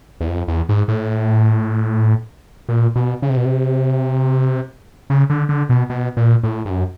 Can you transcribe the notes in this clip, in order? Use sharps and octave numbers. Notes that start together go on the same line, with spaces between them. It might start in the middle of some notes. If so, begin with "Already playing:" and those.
E2
F2
E2
G#2
A2
A#2
B2
C#3
C3
B2
C3
C#3
D3
D3
B2
B2
A#2
A2
G2
F#2